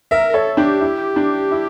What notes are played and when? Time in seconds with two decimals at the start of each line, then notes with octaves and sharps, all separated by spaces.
0.11 A#4 E5
0.30 A#4
0.34 A4 C#5
0.57 D4 G4
0.81 E4
1.16 D4
1.51 E4